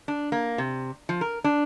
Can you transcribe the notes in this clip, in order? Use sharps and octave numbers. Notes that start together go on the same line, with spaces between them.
D4
A#3
C3
F3
A#4
D4